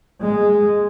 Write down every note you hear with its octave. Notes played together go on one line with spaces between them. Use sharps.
G#3